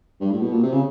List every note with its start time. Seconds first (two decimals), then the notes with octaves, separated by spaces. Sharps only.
0.21 G2
0.31 A2
0.41 B2
0.52 A#2
0.63 C3
0.72 C#3